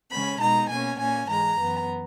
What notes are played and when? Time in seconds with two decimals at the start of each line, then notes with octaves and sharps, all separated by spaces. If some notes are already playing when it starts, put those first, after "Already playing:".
0.11 C#3 G#3 C#4 B5
0.40 B2 G#3 D#4 A#5
0.69 B2 A#3 C#4 G#5
0.99 A#2 A#3 C#4 G#5
1.28 G#2 E3 G#3 A#5
1.58 F#2 E3 B3